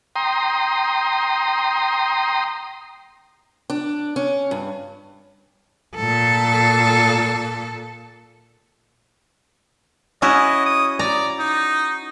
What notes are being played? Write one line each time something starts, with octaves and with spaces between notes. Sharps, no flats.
G5 A#5 C6 D#6
D4
C#4
G2
A#2 A4
C#4 E4 F#4 D#5
D#6
D5 A#5
D#4